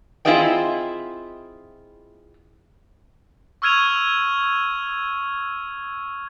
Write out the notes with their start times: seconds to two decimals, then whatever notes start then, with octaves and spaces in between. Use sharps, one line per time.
0.25 C4 E4 F4 G#4 D#5 G5
3.62 C#6 E6 F6 G#6 D#7 F7